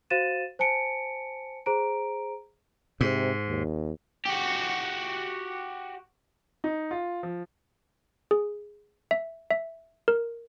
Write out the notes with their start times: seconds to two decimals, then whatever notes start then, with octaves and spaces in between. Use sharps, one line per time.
0.10 F#4 C5 F5 A6 D#7 E7
0.59 C5 G#5 A5 C#7 D7
1.66 G#4 C5 A#5 D7
3.01 G#2 C3
3.49 D#2
4.25 F#4 G4
6.64 D#4
6.91 F4
7.23 F3
8.31 G#4
9.11 E5
9.51 E5
10.08 A#4